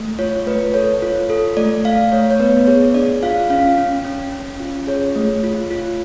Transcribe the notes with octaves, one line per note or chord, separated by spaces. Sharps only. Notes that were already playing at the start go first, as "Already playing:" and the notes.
Already playing: A3
F4 C#5
A3 B4
A4 C#5
F4
A4
A3 D5
A3 F5
A3 C#5
C#5
B3 B4
G#4 C#5
D4 D5
F4 F5
C#4 F5
C#4
C#4
C#4
F4
G#4 C#5
A3
F4
F4